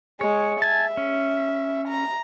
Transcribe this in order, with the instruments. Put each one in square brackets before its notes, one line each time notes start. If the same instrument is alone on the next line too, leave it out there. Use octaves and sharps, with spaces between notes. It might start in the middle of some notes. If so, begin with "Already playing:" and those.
[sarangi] G#3 [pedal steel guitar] C#5
[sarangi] E5 [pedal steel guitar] G#5 A5
[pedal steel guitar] C#4
[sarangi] A#5